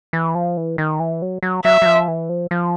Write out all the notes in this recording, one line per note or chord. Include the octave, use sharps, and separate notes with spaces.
E3
F3
E3
D#3
E3
F#3
F#3
F#3 E5
F#3
F3
E3
F3
F3